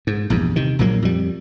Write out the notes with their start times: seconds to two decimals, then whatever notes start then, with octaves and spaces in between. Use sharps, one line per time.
0.07 G#2
0.30 A#1 E2 G2
0.56 C3 D#3
0.79 A#1 A#2 F#3 A#3
1.02 F2 G3